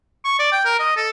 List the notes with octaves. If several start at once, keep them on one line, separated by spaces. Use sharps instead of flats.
C#6
D5
G5
A#4
D#5
A4